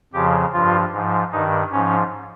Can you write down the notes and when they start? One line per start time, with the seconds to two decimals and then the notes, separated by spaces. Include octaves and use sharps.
0.13 F2 C#3 F3 G4
0.53 G2 F3 F4
0.92 G#2 F3
1.32 G2 D#3 D#4
1.71 G#2 F3 C#4